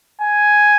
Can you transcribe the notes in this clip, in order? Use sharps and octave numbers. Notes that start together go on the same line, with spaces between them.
G#5